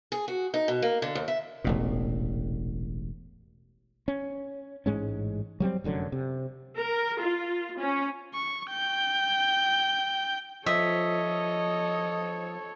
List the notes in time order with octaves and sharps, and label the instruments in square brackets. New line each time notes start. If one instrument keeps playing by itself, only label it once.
[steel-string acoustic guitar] G#4
F#4
D#4
B2
A#3
D3
D#2
E5
[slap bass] E1 A1 A#2
[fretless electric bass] C#4
A1 G#2 G#3 C#4
F#3 G3 A#3 C4
F1 F#2 D3 F#3
C3
[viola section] A#4
F4
C#4
[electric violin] C#6
G5 G6
[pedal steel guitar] F3 [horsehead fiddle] A4 C#5 [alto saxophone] D#5 [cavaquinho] E5